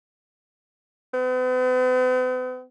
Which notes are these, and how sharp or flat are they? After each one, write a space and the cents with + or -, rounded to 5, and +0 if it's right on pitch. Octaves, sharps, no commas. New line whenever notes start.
B3 +45